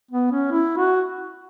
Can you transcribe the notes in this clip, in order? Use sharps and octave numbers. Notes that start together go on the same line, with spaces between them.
B3
C#4
E4
F#4